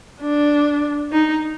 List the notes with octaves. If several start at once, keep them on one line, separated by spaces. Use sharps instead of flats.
D4
D#4